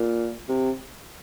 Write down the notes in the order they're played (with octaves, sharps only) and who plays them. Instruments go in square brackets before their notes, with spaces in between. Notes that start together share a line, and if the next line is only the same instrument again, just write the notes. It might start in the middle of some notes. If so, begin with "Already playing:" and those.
Already playing: [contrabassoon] A#2
C3